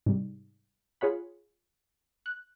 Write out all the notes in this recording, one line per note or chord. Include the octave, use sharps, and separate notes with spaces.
G#2 C3 G3
F4 G#4 C#5 F#5 B5
F#6